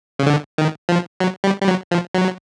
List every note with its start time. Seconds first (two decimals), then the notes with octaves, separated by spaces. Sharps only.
0.19 C#3
0.27 D3
0.58 D#3
0.89 F3
1.20 F#3
1.44 G3
1.61 G3
1.68 F#3
1.91 F3
2.15 F#3